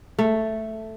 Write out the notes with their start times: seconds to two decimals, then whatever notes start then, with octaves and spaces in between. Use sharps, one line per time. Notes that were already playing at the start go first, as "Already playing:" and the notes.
0.19 A3